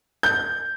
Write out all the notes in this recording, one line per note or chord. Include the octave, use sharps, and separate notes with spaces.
G6